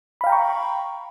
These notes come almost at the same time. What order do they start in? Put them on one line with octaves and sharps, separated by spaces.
B5 F5 G5 A#5 C#6